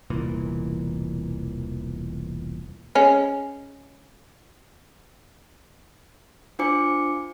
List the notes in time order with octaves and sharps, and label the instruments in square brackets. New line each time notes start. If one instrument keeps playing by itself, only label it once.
[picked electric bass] E1 C2 A#2 E3
[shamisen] G#3 C#4
[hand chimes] D4 F4 C5 G#5 D6 C#7